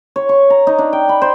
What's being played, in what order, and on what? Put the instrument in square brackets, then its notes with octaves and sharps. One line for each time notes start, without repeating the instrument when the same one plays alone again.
[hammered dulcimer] C#5
C#6
A#5
D#4
D4
G5
B5
C5